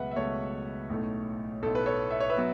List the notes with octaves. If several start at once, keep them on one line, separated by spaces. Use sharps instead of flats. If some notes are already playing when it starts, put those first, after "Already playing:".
Already playing: C#2 B2 F#3 A3 B4 E5 F#5
E5
C#2 B2 F#3 A3 A4 C#5
B1 A2 A3
B1 A2 A3 A4
B4
A4 C#5
E5
C#5
B4 E5
B2 F#3